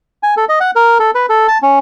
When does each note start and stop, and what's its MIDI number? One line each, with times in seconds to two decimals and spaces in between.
0.23 0.35 80
0.37 0.45 69
0.49 0.59 75
0.61 0.71 78
0.76 0.98 70
1.00 1.11 69
1.15 1.26 71
1.29 1.47 69
1.48 1.58 81
1.62 1.79 61